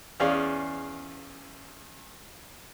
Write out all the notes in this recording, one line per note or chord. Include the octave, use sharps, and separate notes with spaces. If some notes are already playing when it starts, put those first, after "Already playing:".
E2 C#4 G#4 D5 F5